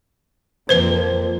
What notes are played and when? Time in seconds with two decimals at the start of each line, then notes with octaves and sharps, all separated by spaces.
0.69 F2 F3 A#3 B4 C5